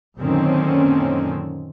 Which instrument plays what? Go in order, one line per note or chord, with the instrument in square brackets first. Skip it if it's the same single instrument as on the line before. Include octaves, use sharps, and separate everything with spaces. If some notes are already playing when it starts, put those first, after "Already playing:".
[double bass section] F#2 A#2 D3 D#3 C4 C#4